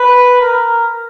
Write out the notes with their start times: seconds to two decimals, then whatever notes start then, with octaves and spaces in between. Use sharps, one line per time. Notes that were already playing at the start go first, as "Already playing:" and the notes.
Already playing: B4
0.41 A#4